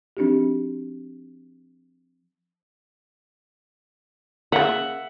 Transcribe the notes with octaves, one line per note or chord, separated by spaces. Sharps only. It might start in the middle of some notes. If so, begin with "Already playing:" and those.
F3 C4 D4 D#4 F#4 G4
C#3 A#3 E5 F#5